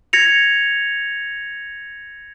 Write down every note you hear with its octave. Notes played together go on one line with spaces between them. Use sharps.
G#6 A#6 C#7 F7